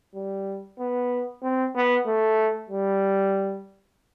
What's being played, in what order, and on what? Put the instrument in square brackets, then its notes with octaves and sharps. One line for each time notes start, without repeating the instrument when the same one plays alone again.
[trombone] G3
B3
C4
B3
A3
G3